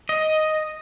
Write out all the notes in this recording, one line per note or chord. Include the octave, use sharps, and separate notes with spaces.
D#5